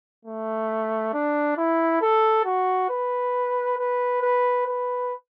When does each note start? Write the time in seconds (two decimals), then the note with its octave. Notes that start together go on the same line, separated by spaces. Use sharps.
0.25 A3
1.13 D4
1.57 E4
2.02 A4
2.45 F#4
2.90 B4
3.78 B4
4.22 B4
4.67 B4